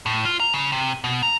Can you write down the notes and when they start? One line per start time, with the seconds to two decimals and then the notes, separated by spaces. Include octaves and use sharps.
0.06 A2
0.25 F4
0.40 A#5
0.54 C#3
0.72 C3
1.04 B2
1.23 A#5